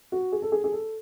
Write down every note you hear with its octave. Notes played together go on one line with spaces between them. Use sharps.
F#4
G#4
A4
G#4
G#4
A4